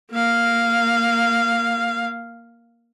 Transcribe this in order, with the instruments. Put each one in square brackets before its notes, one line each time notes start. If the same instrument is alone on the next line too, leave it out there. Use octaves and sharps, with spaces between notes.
[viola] A#3 F5